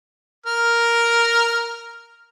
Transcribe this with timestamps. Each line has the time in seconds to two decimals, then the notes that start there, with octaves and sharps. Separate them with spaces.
0.46 A#4 F6